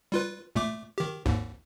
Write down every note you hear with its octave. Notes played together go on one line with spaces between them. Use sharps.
G3 F4 B4
A#2 A3 D6
D#3 G4
G#1 D#2 G#2